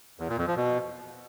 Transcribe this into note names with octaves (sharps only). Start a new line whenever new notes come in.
E2
A#2
F2
F3
B2